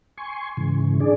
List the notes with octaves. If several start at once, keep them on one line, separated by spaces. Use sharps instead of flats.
G#5 C6 C#6
G#2 C#3 E3
D4 G#4 D5